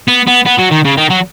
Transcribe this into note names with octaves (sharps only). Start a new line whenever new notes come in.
B3
B3
B3
F#3
D#3
C#3
D#3
F#3